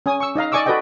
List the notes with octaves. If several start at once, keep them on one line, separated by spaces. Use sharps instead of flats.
C#4 G#5 D#6
C#6 E6
D#4 D#5 F5 A#5
D5 D#5 G#5 C#6 D6 E6
F#4 A4 B4 D5 D#5 G5